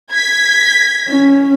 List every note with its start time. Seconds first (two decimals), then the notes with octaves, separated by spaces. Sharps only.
0.12 G#6 B6
1.08 C#4